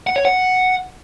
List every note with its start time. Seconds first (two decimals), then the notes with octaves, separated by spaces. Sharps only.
0.07 F#5
0.16 C#5
0.25 F#5